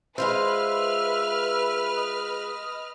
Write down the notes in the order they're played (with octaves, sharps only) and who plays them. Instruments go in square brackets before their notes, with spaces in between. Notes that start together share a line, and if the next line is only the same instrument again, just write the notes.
[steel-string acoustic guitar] G#3 F4 C5 [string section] B4 F6 [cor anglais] E5
[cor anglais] D#5